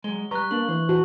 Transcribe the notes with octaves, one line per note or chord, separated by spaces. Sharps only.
F#3 G#3 G7
G3 B4 A#5 C#6 F#6
A#3 D4 F#7
E3 C5
E2 F#4 C5 A5